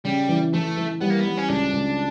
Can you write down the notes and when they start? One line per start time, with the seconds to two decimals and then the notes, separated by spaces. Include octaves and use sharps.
0.05 C#3 G3
0.29 E3
0.53 E3 A3
0.77 E3
1.01 G3 B3
1.10 A#3
1.19 B3
1.25 G3
1.37 C#4
1.49 C#2 D4
1.73 C#2